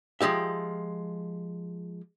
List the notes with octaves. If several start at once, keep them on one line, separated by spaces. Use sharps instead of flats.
F3 G#3 G4 E5